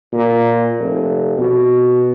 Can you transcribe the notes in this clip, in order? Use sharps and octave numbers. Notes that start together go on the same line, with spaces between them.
A#2
F1
B2